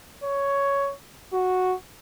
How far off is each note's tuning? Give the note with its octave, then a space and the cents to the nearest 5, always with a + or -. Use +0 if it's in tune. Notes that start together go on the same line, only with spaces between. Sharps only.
C#5 +10
F#4 -5